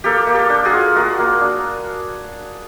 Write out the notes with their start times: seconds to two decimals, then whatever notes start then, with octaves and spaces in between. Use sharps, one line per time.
0.04 A#3 G4 A4
0.27 A#3
0.34 G4 A4
0.49 D4
0.65 F#4 G#4
0.72 F4
0.96 A#3 F#4
1.19 A#3
1.41 D4